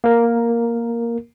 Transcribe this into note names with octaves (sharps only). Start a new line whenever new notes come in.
A#3 A#4